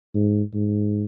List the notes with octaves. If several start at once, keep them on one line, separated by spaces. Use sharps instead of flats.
G#2
G#2